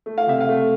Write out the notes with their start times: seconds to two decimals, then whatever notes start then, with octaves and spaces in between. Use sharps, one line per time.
0.06 A3
0.18 F5
0.27 C3 E5
0.40 F5
0.49 A3